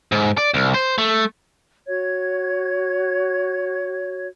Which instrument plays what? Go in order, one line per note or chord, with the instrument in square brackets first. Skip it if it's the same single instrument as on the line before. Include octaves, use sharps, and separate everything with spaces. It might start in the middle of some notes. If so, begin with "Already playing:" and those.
[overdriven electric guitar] G#2
D5
C2
C5
A3
[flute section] F#4 C#5 G#6